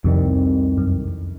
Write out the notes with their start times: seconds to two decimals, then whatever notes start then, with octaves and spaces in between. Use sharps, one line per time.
0.04 C2 F2 C3 D#3 G3
0.78 F#2